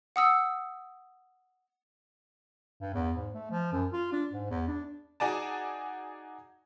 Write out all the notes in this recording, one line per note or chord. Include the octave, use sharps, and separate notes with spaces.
F#5 D#6 E6
G2
E2
G#2
A3
F3
F#2
F4
D4
G#2
E2
D4
D#4 F#4 G#4 D5 G#5 A5